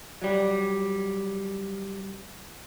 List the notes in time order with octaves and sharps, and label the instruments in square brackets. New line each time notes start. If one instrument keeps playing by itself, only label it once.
[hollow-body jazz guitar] F#3 G3